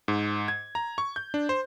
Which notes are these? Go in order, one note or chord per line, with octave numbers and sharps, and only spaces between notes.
G#2
G#6
A#5
C#6
G6
D4
C5